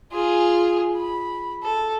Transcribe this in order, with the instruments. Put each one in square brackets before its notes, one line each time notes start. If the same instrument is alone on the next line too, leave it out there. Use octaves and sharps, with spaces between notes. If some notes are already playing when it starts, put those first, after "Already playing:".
[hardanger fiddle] F4 G#4
B5
A4